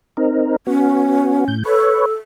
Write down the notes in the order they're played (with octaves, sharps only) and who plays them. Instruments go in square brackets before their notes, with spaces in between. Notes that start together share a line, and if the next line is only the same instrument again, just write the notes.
[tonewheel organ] C4 D#4 A#4
[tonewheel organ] B3 F#4 [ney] C#4
[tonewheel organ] A2 G6
[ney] A4 [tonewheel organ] B4 C#5